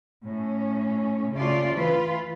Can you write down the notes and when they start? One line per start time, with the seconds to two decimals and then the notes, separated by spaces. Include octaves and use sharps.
0.25 A2 C#4
1.33 C#3 A3 F4 D5
1.74 E3 F4 B4